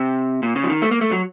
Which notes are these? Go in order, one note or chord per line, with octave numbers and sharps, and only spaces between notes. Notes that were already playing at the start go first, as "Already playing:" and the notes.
Already playing: C3
A#2
C#3
F3
D#3
A3
A#3
A3
F#3